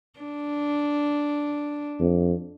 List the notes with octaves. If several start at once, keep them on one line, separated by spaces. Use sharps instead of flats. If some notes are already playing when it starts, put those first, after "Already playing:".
D4
F2